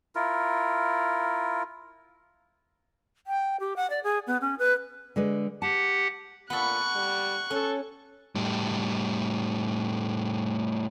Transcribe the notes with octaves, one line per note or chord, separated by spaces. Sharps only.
E4 F4 A#4
G5
G4
F#5
D5
G#4
B3
C#4
B4
D3 G#3 B4
G4 F#5 A5
A#2 B3 A4 C#6 F#6
G3
C#4 A4
A2 G3